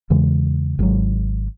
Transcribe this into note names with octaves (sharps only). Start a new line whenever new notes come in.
E2 C#3 E3 G#3
G#1 G#2 F#3